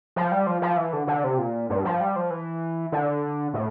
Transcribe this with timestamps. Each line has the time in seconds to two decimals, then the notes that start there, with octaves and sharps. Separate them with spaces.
0.16 F3
0.32 G3
0.47 F3
0.62 F3
0.77 E3
0.93 D3
1.07 D3
1.24 C3
1.38 A#2
1.70 G2
1.85 F3
2.01 G3
2.16 F3
2.30 E3
2.92 D3
3.54 A2